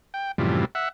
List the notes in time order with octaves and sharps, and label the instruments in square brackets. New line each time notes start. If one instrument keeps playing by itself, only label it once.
[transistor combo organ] G5
F#2 A2 C3 E3 F3 G3
E5 F#5